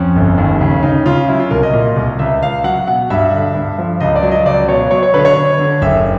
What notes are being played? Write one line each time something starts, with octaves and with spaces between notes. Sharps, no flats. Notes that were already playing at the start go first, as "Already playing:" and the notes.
Already playing: F2 C#4
G1
D#2
C#3
C#3 D#4
C#3 F4
F#3 E4
F4
C2 A#4
D#5
A#2
C2
C#2 E5
C#2 F5
F#3 F#5
B2 F#5
G2 E5
D3
G2
F3
C#2 D#5
D5
F#3
D#5
C#2 D5
B2 C#5
F#3 C#5
C#5
D3 B4
C#5
D3
D3
F#1 E5